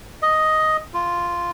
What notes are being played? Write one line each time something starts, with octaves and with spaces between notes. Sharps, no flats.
D#5
F4